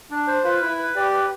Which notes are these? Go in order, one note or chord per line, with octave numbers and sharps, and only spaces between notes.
D4
C5
F4 B4
E4
B4
G4 D5
B4